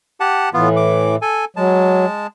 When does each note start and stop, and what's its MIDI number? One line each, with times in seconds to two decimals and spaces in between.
0.20 0.49 67
0.20 0.49 78
0.20 0.49 81
0.54 1.16 45
0.54 1.16 52
0.54 0.69 59
0.54 0.69 65
0.76 1.15 86
1.22 1.45 69
1.22 1.45 80
1.56 2.06 54
1.56 2.27 56
1.56 2.27 81